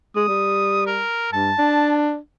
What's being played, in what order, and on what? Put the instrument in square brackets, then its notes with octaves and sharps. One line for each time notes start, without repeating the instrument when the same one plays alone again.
[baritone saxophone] G#3 [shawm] D#6
[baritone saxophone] G3
[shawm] A#4
[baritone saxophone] G2 [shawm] A5
[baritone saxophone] D4